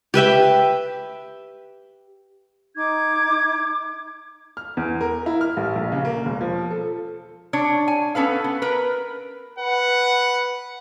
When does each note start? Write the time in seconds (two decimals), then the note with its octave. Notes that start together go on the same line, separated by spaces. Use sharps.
0.14 G4 B4 E5 G5
2.76 D#4 D6 G#6
4.57 F6
4.77 E2
5.01 A#4
5.26 E4
5.41 F6
5.57 A1
5.76 A#1
5.92 C#3
6.05 A#3
6.25 E1
6.41 F3
6.71 A4
7.53 D4 C#5
7.88 G#5
8.15 B3 C#4 A4 B4 F5
8.44 B3
8.62 A#4 B4
9.59 B4 F#5